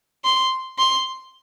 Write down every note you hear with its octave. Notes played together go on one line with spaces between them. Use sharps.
C6
C6